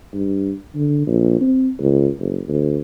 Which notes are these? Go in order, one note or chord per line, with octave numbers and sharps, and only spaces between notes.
G2
D3
A#1
C4
C#2
F#1
D2